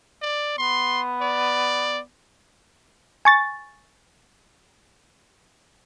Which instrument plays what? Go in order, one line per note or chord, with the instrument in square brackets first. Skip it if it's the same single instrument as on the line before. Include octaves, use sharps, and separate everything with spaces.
[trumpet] D5
[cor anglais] B3 [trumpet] C6
[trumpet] D5
[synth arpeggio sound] G#5 C#6 A6